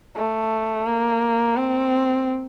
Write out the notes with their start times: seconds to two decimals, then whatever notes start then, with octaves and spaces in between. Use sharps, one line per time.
0.16 A3
0.86 A#3
1.56 C4